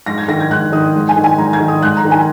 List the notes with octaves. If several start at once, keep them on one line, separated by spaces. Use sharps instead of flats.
G#2 A#6
G#6
D#3 A#6
G#6
G#2 F#6
D#3 D#6
G#2
G#5
D#3
G#5
G#2 A#5
G#6
D#3
D#6
G#2 F#6
A#5
D#3
G#5